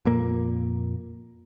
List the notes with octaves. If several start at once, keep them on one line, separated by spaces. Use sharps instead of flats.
F2 A#2 A#3